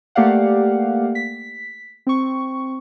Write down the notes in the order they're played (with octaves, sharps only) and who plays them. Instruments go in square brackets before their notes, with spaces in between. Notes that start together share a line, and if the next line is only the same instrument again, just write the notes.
[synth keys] A3 A#3 G4 D5 F5 F#5
B6
C4 C#6